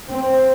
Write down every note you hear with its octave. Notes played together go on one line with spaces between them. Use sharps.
C4